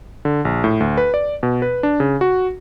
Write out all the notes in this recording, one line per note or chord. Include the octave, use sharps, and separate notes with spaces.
D3
A#1
A2
D2
B4
D5
B2
B4
D4
C#3
F#4